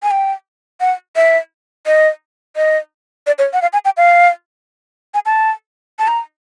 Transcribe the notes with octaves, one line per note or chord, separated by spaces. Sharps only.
G#5
G5
F#5
E5
D#5
D#5
D5
C#5
F#5
F5
G#5
G5
F5
G#5
A5
A5
A#5